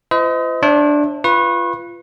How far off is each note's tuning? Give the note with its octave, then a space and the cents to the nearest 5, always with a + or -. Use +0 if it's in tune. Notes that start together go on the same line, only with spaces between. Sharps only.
F4 -40 C5 -45 D#5 +25
D4 +0 C5 +45 E5 -5
F4 -20 B4 +0 C#6 -40